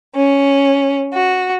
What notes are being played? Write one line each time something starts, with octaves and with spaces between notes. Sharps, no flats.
C#4
F#4